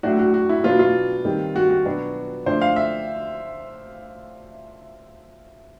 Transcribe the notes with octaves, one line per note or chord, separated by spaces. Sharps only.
A2 F#3 A3 D4 F#4
F#4
F#4
E4
B2 F#3 B3 D4 F4
F4
D#3 G3 C4
F#4
F#4
B2 F#3 B3 D4
D3 F3 A3 D4 C5
F5
E5